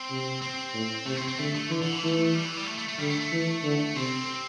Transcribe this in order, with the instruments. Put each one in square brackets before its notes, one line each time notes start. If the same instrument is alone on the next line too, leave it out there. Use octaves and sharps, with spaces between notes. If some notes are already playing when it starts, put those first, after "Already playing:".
Already playing: [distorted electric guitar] C4
[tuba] C3
[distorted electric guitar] C4
[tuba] A2
[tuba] C3 [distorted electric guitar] A3
[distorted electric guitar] C4
C4
[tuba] D3 [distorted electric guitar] A3
[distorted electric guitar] A3
[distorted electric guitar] D3 [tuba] E3
[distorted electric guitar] D3
E3
[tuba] E3 [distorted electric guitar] A3
[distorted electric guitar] A3
A3
G3
E3
G3
A3
A3
A3
[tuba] D3 [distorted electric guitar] G3
[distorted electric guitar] A3
A3
[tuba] E3
D3
[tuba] C3 [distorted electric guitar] C4